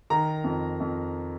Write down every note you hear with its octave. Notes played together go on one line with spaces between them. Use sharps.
D#3 A#5
F2
F2